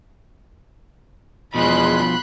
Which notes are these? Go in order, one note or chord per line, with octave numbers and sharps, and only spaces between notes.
E2 B2 F3 G#3 B5 C6 F#6